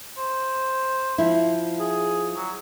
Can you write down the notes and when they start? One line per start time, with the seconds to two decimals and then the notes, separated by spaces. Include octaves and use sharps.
0.18 C5
1.18 F3 E4
1.79 G#4
2.36 F#3